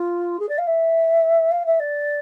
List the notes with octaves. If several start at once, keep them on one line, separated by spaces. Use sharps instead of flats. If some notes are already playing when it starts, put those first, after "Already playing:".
Already playing: F4
G#4
D5
F5
E5
F5
E5
D5